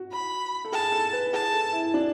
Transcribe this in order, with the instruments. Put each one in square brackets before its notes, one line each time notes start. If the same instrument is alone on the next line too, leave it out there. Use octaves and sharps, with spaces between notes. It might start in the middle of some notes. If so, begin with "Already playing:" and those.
Already playing: [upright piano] F#4
[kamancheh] B5
[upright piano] A4
[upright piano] G#4 [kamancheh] A5
[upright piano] A4
B4
[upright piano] G#4 [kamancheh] A5
[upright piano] A4
E4
D4